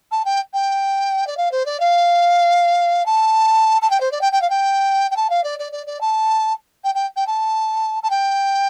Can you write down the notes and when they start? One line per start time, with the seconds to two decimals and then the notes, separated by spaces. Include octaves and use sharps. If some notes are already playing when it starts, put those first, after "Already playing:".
0.11 A5
0.25 G5
0.53 G5
1.27 D5
1.37 F5
1.51 C5
1.66 D5
1.80 F5
3.06 A5
3.82 A5
3.90 G5
4.00 C5
4.11 D5
4.21 G5
4.32 G5
4.41 F5
4.50 G5
5.11 G5
5.16 A5
5.30 F5
5.44 D5
5.59 D5
5.72 D5
5.86 D5
6.01 A5
6.84 G5
6.95 G5
7.16 G5
7.27 A5
8.03 A5
8.10 G5